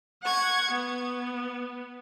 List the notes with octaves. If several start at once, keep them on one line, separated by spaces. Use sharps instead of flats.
F#5 C#6 G#6
B3